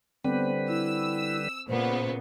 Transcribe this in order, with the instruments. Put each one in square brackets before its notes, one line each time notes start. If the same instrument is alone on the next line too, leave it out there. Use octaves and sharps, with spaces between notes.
[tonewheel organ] D3 G3 B4 [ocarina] B3 [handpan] C4
[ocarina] E4 [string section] E6
[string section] A#2 C#3 B3 [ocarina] C5